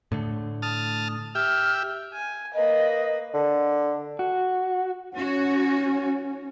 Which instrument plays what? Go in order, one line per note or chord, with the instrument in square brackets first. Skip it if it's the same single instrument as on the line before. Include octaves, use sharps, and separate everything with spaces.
[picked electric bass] A2 D3 A3
[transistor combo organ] A5 D#6 F6
[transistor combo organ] G4 E5 [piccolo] F6
[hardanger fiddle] G#5
[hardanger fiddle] A#3 B4 [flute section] D#5
[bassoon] D3
[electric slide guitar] F#4
[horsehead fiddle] C#4 [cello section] F#4 C#5